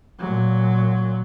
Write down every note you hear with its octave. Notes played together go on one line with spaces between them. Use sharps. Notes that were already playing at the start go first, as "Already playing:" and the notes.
A#2 F#3